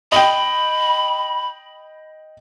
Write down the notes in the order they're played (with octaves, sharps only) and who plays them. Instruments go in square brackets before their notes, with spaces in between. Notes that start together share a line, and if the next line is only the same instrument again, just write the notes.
[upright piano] D#5 G5 [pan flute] B5